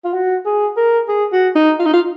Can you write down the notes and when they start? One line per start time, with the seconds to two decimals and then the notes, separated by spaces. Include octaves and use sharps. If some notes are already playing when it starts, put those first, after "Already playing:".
0.04 F4
0.14 F#4
0.45 G#4
0.77 A#4
1.08 G#4
1.32 F#4
1.55 D#4
1.79 F4
1.86 D#4
1.93 F4